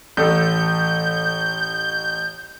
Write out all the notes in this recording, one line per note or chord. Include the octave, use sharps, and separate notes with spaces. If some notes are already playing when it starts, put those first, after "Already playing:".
A1 A4 G6